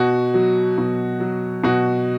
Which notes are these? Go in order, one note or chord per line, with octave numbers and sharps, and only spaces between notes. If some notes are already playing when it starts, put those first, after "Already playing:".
Already playing: B2 F#4
F#3
B2
F#3
B2 F#4